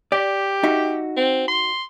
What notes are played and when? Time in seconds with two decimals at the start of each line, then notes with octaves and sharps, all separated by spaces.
0.12 G4 D5
0.63 D#4 F#4 E5
1.17 C4
1.48 C6